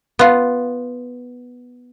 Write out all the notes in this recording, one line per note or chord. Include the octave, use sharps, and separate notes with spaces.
B3 F4